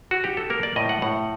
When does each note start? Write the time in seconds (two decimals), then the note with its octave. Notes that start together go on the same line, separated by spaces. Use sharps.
0.11 F#4
0.24 G4
0.37 A4
0.50 A#3 A#4
0.63 D5
0.76 A2 D#5
0.89 F#5
1.02 A2 F#5